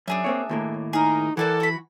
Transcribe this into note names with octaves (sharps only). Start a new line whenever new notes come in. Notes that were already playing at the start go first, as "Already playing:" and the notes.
F#2 D4 G#4 E5
A#3 C4 C#5
D#2 A2 A#3
D#4 G#4 A#4
E3 A#3 A4 D5 F#5
F#4 B5